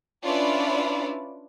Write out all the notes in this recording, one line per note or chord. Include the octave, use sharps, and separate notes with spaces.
C#4 D4 E4 F4 B4 D5